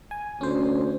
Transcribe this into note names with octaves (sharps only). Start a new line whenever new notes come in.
G#5
D2 C#4 C5